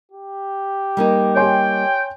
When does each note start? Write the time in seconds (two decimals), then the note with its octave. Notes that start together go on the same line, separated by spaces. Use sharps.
0.12 G4
0.97 G3 A#3 D#4
1.36 C#5 G5 G#5 C6